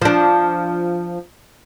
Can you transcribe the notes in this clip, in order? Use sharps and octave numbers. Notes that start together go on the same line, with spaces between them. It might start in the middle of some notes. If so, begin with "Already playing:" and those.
F3 D4